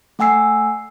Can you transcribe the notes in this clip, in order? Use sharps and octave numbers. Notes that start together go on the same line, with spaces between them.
A3 F#5 G#5 E6 C7